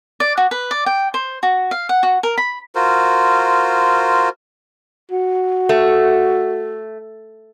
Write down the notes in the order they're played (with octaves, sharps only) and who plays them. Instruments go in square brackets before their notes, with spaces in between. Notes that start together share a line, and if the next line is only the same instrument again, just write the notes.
[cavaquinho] D5
F#4
B4
D5
G5
C5
F#4
F5
F#5
F#4
A#4
B5
[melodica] F4 F#4 A#4 C5
[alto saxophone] F#4
[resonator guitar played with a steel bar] A3